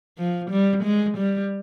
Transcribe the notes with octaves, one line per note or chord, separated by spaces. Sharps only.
F3
G3
G#3
G3